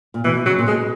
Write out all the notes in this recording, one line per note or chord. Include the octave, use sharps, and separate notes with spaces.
A#2
B2 E3
C#3 F#3
A#2
B2 G#3